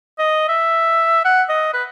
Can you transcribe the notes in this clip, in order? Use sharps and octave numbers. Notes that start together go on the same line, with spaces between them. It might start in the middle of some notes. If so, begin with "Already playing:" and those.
D#5
E5
F#5
D#5
B4